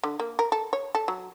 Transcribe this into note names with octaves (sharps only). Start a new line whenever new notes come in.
D3
A#3
A#4
A4
C#5
A4
F#3